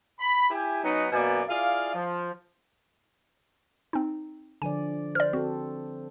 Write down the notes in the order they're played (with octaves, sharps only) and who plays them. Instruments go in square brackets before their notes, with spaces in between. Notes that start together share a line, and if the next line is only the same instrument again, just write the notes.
[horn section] B5
E4 G4 G#5
F#3 B3 C#4 D#4
F#2 B2 A#3 B3 D5 G#5
E4 F4 G#4 D5 F5
F3
[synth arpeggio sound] C4 D#4
[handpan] D3 F3 D5 [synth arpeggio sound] G#5
[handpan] C5 [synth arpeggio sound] D5 F6
[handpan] C4 A4 [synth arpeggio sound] F#4